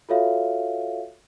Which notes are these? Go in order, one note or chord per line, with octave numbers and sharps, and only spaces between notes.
F4 F#4 A4 C#5 E5 F5